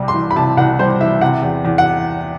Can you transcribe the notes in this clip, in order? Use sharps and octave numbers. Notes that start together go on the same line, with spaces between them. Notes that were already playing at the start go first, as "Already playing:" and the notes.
Already playing: C2 C3 G3
C6
E3
B5
C3 A5
C2 F#5
G3 C5
E3 E5
C3 F#5
E2
E2
F#5